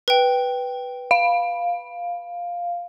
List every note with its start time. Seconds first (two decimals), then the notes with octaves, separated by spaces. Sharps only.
0.08 B4 G5
1.11 F5